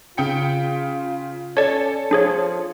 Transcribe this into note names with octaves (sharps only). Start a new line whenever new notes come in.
C#3 F4 G5 C#7
C#4 A4 C#5 D5
F3 D4 G#4 C#5